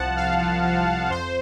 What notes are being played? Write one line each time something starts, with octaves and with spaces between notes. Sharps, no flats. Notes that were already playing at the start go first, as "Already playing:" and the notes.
Already playing: C2 F3 F#5 A5
C2 F5
F3
F3
F3
F2 C5